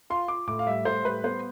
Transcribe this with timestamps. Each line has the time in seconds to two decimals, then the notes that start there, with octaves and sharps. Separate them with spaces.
0.10 F4 C6
0.28 F4 D6
0.47 A2 D6
0.59 F5
0.67 G3 E5
0.85 A2 C5
1.04 G3 B4
1.24 B3 C5